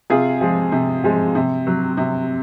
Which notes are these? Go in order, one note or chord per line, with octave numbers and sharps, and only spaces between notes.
C3 F4 G#4
F3 G#3
C3
F3 G#3
C3
F#3
C3